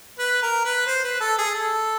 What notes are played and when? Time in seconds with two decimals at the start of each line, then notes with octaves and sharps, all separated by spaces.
0.19 B4
0.42 A#4
0.64 B4
0.87 C5
1.04 B4
1.20 A4
1.38 G#4
1.55 A4